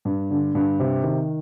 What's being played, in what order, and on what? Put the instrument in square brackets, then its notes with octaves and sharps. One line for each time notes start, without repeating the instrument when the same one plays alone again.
[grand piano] G2
D3
G2
C3
D#3